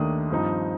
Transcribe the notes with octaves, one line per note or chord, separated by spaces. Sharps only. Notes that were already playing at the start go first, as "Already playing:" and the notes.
Already playing: D#2 D#3 A3 D4 D#6
G2 F3 C4 D#4